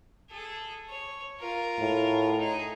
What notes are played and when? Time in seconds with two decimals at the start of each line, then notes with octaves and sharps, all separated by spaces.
0.30 G#4 A4
0.89 C#5
1.40 F4 A#4
1.79 A2
2.39 D#4 G#4